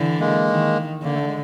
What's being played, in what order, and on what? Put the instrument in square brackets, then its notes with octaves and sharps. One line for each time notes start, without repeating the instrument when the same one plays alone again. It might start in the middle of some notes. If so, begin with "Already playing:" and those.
Already playing: [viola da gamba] D3 E3
[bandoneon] G#3 A#3
[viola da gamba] D#3
[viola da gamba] D3 [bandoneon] A#3
[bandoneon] A3
G#3